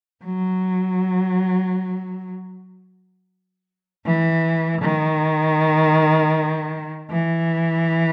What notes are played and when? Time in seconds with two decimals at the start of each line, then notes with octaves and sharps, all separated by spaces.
0.25 F#3
4.06 E3
4.82 D#3
7.10 E3